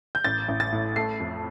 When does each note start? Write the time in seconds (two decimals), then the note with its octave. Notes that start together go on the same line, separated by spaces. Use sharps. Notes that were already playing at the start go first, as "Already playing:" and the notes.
0.15 G6
0.24 A1 A6
0.48 A1
0.60 A6
0.72 A2
0.96 A3 C7
1.20 F2